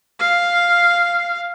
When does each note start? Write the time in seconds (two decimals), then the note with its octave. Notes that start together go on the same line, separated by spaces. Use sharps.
0.19 F5